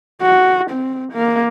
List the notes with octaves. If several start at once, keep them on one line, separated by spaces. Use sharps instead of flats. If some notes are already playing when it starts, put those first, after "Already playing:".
F#4
C4
A#3